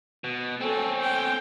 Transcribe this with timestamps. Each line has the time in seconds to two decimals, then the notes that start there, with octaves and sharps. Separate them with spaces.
0.24 B2
0.61 C4 C#4 A4
1.02 G5